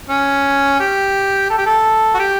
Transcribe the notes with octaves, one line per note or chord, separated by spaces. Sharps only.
C#4
G4
A4
G4
A4
F#4
G4